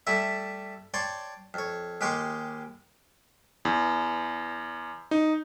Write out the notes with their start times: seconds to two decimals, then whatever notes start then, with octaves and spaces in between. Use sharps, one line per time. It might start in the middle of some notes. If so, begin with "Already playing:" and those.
0.07 G3 A3 E4 E5
0.94 C#5 D5 G5 A5 C6
1.54 F2 C#5
2.01 D#2 G#3 G4 G5 C6 C#6
3.65 E2
5.11 D#4